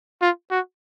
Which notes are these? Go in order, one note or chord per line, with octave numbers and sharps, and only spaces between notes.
F4
F#4